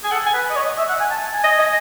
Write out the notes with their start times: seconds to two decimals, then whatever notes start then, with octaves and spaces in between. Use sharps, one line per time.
0.04 G#4 G#5
0.11 A4 F#5
0.26 G#5
0.34 B4
0.50 D#5
0.56 C#5
0.67 D#5
0.78 E5
0.89 F#5
1.00 G#5
1.11 A5
1.22 A5
1.33 G#5
1.44 D#5
1.59 D#5